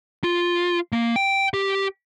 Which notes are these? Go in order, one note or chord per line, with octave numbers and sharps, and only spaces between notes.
F4
A#3
G5
G4